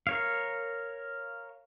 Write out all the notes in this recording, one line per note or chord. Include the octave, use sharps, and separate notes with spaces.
A#4 C#5 F5